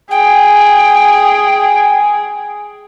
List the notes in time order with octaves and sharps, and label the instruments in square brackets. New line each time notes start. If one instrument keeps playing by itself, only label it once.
[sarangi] G#4 [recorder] G5